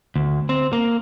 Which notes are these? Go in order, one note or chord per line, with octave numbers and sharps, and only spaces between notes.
D2
C4
A#3